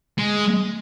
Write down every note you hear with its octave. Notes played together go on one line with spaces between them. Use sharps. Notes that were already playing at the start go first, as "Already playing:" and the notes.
G#3